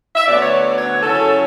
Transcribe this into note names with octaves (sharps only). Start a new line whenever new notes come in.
E5
D2 D3 F#3 B3 D5
C#5
D5
C#5
F#2 C#3 F#3 C#4 E4 A4